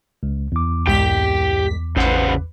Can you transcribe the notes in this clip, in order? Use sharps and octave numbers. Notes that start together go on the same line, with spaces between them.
C#2
E2 D6
C2 G#2 G4 G5 B6
A1 C#3 B4 C5 F#5